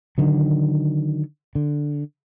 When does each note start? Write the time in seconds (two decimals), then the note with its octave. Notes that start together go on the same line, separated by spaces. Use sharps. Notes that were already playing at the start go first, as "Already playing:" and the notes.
0.18 D3 D#3 F#3
1.55 D3